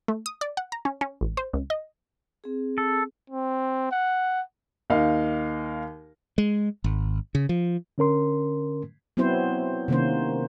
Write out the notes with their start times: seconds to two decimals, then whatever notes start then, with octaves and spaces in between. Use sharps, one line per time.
0.08 A3
0.26 D#6
0.41 D5
0.57 F#5
0.72 A#5
0.85 C#4
1.01 C#4
1.21 A1
1.37 C5
1.53 C#2
1.70 D#5
2.44 C4 G#4
2.78 A4
3.30 C4
3.91 F#5
4.90 D#2 D#4 F5
6.38 G#3
6.84 G#1
7.35 C#3
7.49 F3
7.98 D3 C#4 A#4 C6
9.17 F#3 B3 C4 E4 C5
9.88 C3 D#3 A#3 C#4 C5